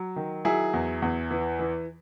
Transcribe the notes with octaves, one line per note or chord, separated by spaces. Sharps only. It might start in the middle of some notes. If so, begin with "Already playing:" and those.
Already playing: F#3
D#3
F#3 E4 G#4
E2
E2
E3
E3